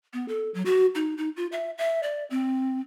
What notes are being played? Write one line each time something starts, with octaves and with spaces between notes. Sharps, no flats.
B3
A4
F#3
F#4
D#4
D#4
F4
E5
E5
D5
C4